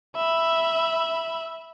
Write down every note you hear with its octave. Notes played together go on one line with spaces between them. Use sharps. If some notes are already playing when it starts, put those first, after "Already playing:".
E5 B5